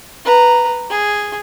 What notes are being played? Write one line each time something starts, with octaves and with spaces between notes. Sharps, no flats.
B4 A#5
G#4